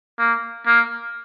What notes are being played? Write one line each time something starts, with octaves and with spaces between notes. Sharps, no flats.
A#3
A#3